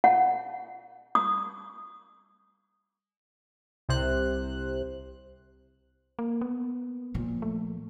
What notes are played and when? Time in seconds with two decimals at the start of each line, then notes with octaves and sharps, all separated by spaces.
0.04 F#5
1.15 D#6
3.89 C2 C3 C5 F#6
6.19 A#3
6.41 B3
7.14 A#2 F3
7.42 A3